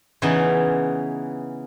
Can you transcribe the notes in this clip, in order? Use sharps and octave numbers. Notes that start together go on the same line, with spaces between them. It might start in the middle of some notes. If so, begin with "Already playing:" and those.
C#3 E3 B3 D#4